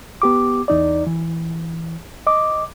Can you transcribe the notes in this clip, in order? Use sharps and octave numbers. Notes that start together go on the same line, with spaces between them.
B3 G4 D6
E2 D#4 D5
E3
D#5 D6